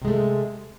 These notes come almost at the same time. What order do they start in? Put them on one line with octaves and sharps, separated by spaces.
C3 G#3 A3